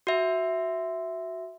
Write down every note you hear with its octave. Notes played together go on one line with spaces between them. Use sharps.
F#4 E5